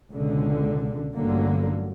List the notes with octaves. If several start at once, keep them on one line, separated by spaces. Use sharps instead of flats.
C#2 B2 D3
A1 G2 D3 F#3 A#3